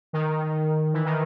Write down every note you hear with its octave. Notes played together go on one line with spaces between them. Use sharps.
D#3
E3
D#3